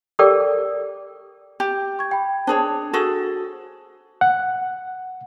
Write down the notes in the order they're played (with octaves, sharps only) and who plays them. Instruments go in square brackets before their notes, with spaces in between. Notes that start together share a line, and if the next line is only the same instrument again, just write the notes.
[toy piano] G4 A4 A#4 D5 G5 D6
[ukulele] G4
[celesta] C#6 G#6
G5 B5
[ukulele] D4 G#4 C#5 [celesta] C5 A5
[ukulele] F#4 G#4 A4
[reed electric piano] F#5